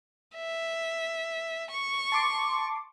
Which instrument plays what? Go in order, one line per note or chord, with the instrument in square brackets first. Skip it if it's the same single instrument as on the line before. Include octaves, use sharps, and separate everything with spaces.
[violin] E5
C#6
[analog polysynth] A5 C6 D6